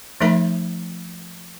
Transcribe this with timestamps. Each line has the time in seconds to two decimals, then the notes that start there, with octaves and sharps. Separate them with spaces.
0.21 F3 A3 D#4 A#4 E5 B5